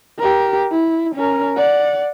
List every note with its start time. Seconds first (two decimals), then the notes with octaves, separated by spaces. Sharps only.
0.19 G4 A#4
0.71 E4
1.15 C#4 A#4
1.57 D5 F#5